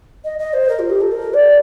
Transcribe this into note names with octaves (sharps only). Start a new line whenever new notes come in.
D#5
D#5
C5
A#4
F4
G4
A4
A#4
D5